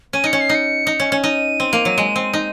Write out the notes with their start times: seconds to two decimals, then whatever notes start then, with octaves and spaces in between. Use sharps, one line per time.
0.13 C#4 D#7
0.24 D#4 C#7
0.33 C#4
0.41 C7
0.49 D#4
0.55 C#7
0.87 D#4
1.00 C#4
1.12 C#4
1.23 D#4 D#7
1.60 C4
1.73 A#3
1.85 F#3
1.98 G#3
2.16 C4
2.33 D#4